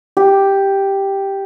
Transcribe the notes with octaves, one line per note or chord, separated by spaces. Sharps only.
G4